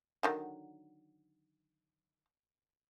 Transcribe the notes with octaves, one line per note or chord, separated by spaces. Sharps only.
D3 D#3 F#3